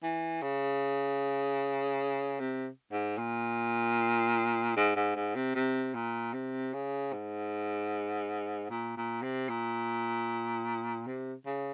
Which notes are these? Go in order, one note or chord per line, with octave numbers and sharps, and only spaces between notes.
E3
C#3
C3
G#2
A#2
G#2
G#2
G#2
C3
C3
A#2
C3
C#3
G#2
A#2
A#2
C3
A#2
C3
C#3